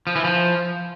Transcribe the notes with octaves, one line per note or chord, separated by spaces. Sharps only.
F3
E3
F3